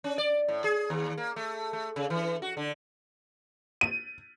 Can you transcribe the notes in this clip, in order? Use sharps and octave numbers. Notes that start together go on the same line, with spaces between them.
C#4
D5
A2
G#4
D#2
A#3
A3
A3
C#3
E3
F#4
D3
D#7